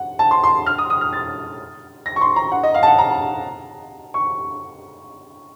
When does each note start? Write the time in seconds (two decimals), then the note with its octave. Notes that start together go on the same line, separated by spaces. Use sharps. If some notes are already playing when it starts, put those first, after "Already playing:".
Already playing: F#5
0.19 A5
0.31 C6
0.44 C6
0.66 F6
0.78 D#6
0.90 D#6
1.01 F6
1.13 A6
2.06 A#6
2.16 C#6
2.21 C6
2.36 A#5
2.52 F#5
2.63 D#5
2.74 F5
2.83 A5
2.87 F#5
2.98 A#5
4.14 C#6